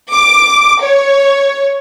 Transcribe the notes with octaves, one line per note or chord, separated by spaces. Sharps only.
D6
C#5